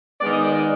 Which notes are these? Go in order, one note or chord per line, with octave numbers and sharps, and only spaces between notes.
D#3 G#3 B3 D5
D#5
D5
D5